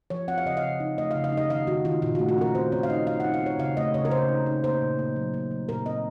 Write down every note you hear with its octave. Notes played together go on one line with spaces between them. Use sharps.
F3 C#5
C4 F#5
F5
C#3 D#5
F5
C#3
D#4
A3 D#5
F5
C#3
F5
D#4
D#5
D#3 F5
D#3 F#4
D#3 F4
A#2 F4
F#4
A3
F#4
C#4 A#4
C4 C5
C4 C#5
F5
D#4 D#5
C4 F5
F#5
D#4
F5
C4 C#5
C#3 F5
A3 D#5
C#3 C#5
A#4
C#3 C5
D#4
D#4
A#3 C5
A#2
A#3
F#3
A#3
F#3
A#2 A#4
C4 D#5